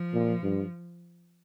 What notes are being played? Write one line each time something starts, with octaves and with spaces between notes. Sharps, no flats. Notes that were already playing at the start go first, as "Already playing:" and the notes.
Already playing: F3
A#2
G2